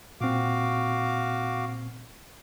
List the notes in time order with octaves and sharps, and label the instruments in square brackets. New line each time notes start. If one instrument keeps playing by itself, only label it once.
[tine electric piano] A#2 C4 [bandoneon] F#4 F5 D6